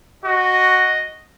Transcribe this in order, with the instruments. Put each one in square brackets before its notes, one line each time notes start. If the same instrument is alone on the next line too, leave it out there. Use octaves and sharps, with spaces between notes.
[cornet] F#4 [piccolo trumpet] D#5